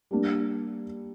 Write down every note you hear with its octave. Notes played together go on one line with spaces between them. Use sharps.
G3 A#3 D4